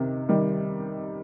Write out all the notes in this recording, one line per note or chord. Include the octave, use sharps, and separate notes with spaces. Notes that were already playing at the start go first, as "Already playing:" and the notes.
Already playing: C3 D#3
D#3 G3